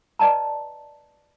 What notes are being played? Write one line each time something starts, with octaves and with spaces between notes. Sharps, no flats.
B4 D5 D#5 A5 A#5